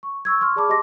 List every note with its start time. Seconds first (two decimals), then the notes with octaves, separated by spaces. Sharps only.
0.03 C#6
0.25 C#6 E6 G#6
0.41 C6 C#6 F6
0.56 G#4 D5 A5 B5 D6
0.69 G4 D#5 A5 C6 D6 A#6